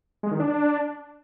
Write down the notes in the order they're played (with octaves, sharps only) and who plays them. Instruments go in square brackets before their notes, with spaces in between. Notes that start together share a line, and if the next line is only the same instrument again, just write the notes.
[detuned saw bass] G#3
D#3
D4